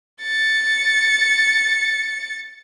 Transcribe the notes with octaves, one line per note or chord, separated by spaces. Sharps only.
A6 C#7